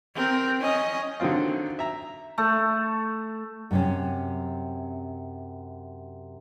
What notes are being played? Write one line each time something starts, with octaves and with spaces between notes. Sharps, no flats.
C4 A#4
C#4 D#5
D3 D#3 F#3 C4 F4
E5 A#5
A3
F#2 C3 C#4